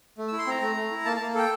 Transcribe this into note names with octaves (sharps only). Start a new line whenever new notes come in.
A3
E4 E6
C6
C4 A#5
A3
A3
E4
A#3 A5
A#3 A5
A4 G5